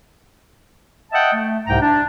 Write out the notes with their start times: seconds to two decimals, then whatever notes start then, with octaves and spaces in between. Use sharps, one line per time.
1.12 D#5 E5 F#5 G5 A5
1.34 A3
1.67 C2 G#2 C3 G5 A#5
1.80 D4